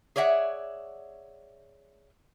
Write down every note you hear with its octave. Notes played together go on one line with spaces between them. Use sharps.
G#4 C#5 D5 E5 F#5